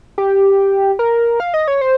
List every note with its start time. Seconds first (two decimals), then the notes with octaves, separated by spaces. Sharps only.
0.18 G4
0.99 A#4
1.40 F5
1.54 D#5
1.68 C#5
1.81 C5